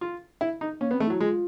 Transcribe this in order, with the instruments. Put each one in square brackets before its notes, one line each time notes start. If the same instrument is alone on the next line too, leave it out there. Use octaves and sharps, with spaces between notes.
[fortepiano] F4
E4
D#4
[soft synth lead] A#3 [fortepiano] C#4
[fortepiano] B3
[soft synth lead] C4
[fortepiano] A3
[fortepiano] F#3 [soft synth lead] E4
[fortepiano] G#3 [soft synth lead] F4